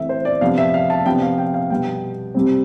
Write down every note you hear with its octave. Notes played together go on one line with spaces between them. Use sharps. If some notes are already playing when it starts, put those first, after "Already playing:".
Already playing: E3 A3 C4 E5
C5
D5
C3 F3 B3 D4 F5
E5
F5
A5
C3 F3 B3 D4 G5
F5
G5
F5
B2 G3 B3 D4 G5
C3 G3 C4